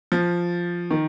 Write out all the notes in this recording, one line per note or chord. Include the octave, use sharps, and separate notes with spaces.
F3
D#3